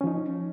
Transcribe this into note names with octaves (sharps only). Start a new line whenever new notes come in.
F3 C#4 D#4